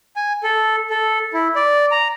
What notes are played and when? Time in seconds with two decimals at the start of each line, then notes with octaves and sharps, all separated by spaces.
0.16 G#5
0.43 A4
0.90 A4
1.33 E4
1.56 D5
1.91 A#5